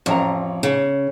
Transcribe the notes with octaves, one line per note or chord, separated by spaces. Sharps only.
A1 F2 A#5
C#3